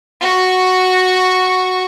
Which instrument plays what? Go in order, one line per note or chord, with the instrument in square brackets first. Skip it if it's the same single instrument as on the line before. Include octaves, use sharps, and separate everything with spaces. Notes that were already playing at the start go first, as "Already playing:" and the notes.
[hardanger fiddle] F#4 C#6